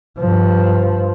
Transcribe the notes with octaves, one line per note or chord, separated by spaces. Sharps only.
G2 F3